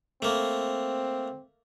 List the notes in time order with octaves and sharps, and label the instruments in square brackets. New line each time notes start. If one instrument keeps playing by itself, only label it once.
[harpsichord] A3 A#3 [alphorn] C4